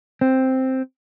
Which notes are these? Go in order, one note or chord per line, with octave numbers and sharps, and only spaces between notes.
C4